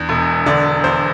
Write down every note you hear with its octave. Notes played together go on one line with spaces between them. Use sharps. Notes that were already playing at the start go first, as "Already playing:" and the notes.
Already playing: E2 D4
E1
D3 D5
E2 C5